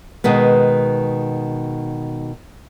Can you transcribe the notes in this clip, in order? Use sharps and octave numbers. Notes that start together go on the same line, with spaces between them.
B2 D#3 G#3 B3